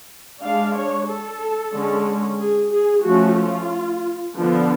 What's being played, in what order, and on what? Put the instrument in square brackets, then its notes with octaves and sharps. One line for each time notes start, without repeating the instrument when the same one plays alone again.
[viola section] G#3 D4 F5
C#5
A4
D3 G#3 C#4
G#4
G#4
F3 A3 C#4 F#4
F4
D3 F3 B3 D4